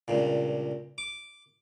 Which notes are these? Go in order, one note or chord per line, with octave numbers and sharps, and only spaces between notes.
C#2 G2 A#2
D6